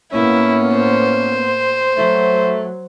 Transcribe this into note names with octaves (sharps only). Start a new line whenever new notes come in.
A2 A#3 B3 C#4 E4
C5
F#3 A3